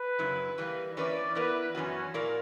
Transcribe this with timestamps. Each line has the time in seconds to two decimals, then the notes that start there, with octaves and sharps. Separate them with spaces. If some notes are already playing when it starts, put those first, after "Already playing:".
Already playing: B4
0.19 F#2 C#3 F#3 E4
0.58 E3 G3 A#3
0.97 E3 A#3 C#4 E4 B4 D5
1.35 E3 B3 E4 A#4 B4 D5
1.75 F#2 E3 B3 C#4 F#4
2.14 A#2 A#3 E4 A#4 D5